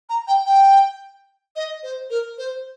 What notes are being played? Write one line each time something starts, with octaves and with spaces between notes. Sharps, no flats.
A#5
G5
G5
D#5
C5
A#4
C5